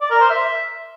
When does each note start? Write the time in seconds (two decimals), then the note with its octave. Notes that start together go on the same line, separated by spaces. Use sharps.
0.01 D5
0.11 A#4
0.20 C5
0.30 E5